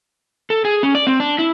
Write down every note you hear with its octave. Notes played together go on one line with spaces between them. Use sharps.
A4
G#4
C#4
D5
C4
D4
E4